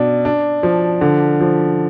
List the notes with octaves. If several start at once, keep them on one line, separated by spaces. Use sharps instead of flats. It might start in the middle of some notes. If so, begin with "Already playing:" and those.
Already playing: B2 D4
D4
F3
D3
F3